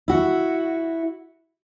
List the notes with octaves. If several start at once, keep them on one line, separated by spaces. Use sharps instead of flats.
E4 F#4